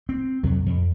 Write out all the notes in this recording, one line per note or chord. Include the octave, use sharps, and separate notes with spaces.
C4
F2 C3 F#3
F2